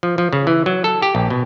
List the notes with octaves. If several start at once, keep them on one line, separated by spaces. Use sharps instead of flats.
F3
F3
C#3
E3
F#3
A4
G4
A#1
B2